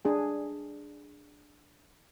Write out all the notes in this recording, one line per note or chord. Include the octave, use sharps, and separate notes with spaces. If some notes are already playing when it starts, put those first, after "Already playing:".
D4 G#4 G#5